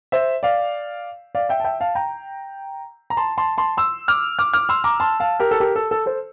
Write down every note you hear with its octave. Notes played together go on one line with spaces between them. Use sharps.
C5 E5
D5 F5
D5 F5
E5 G5
A5
E5 G5
F5 A5
G5 A#5
A#5
A5 C6
A5 C6
A5 C6
C6 E6
D6 F6
D6 F6
D6 F6
C6 E6
A#5 D6
A5 C6
F5 A5
G4 A#4
A4
G4 A#4
A4
A4
A4 C5